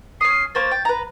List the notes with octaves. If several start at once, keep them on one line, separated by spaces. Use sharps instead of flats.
C#4 D#6 C7
A#3 C5 C#5 A6
G5
B4 A#5